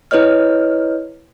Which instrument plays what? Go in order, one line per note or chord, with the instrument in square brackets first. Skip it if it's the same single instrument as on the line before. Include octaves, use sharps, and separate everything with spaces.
[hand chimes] E4 B4 C#5 D#5 F6